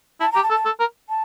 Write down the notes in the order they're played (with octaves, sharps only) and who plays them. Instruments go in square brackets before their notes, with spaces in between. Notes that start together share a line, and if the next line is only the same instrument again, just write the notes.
[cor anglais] E4 [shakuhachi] A5
[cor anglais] G4 [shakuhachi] A#5
[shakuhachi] A5
[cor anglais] A4
[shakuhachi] A5
[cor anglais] A4
A#4
[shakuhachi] A5